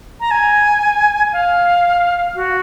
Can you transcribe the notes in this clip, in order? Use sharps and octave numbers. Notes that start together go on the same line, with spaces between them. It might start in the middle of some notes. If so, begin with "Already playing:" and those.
A#5
G#5
F5
F#4